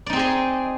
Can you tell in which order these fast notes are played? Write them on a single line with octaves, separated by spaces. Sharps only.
D5 D#4 C4 G#4 D#5